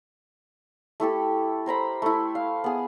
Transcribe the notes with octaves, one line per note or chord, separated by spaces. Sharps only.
A3 E4 G4 A4
A#4 C5 A#5 B5
A3 E4
F5
B3 G#4